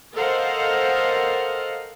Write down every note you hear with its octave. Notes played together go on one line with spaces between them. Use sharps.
A4 A#4 C5 D#5 F5 F#5